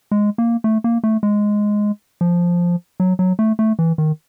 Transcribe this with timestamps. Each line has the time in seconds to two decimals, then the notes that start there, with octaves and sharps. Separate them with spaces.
0.11 G#3
0.38 A#3
0.64 A3
0.84 A#3
1.04 A3
1.23 G#3
2.21 F3
3.00 F#3
3.19 F#3
3.39 A3
3.59 A3
3.79 E3
3.98 D#3